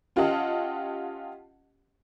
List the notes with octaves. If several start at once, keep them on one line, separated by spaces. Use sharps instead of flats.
C#4 F4 G4 D#5 F#5 A5